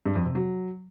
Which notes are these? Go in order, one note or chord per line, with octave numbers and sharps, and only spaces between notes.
G2
F2
C3
F#3